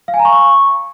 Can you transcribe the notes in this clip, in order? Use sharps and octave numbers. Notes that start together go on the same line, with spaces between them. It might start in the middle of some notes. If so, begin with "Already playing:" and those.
F5
G#5
A#5
C#6